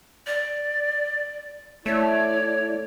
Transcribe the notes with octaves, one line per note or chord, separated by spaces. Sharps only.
D5
A3 E4 C#5 D5